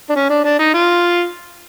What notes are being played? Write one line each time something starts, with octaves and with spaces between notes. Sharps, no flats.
D4
C#4
D4
D4
D#4
F4